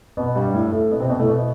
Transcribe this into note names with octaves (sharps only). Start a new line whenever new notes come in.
B2 B3
G2 G3
A2 A3
A2 A3
B2 B3
C3 C4
B2 B3
A2 A3
B2 B3